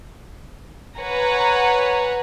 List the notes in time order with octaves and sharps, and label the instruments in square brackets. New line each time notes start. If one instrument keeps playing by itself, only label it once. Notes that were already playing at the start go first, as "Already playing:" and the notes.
[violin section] B4 C#5 F#5 G#5 A#5